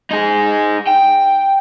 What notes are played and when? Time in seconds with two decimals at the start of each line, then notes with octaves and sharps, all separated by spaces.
0.11 D#4 G#4
0.87 G5